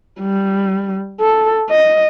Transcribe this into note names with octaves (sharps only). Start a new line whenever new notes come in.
G3
A4
D#5